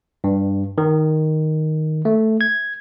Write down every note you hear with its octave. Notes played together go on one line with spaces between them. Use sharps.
G2
D#3
A3
G#6